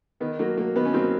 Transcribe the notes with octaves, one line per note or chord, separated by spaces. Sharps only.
D#3 B3
F#3 A#3
F#3 A#3
D#3 B3
C#4
F#3 A#3 C4